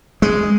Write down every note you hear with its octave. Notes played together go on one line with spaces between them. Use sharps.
G#3